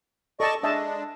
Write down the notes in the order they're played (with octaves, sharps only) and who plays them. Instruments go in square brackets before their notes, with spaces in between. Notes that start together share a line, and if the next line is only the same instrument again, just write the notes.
[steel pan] A4 A5 [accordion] D5 D#5 C#6
[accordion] G#3 D4 [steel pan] D#5 E5 A5